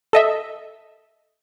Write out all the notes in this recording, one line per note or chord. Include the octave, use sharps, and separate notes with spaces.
A4 D#5 E5